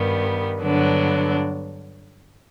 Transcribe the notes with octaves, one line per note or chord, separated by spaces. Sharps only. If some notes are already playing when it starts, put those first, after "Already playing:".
Already playing: G2 D#3 G3 B3
G2 D3 F#3 B3 D4